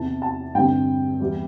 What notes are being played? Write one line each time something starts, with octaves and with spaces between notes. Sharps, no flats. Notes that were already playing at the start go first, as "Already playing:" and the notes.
Already playing: E2 C3 E3 A5
A5
G2 D3 G3 C4 G5
E2 E3 G3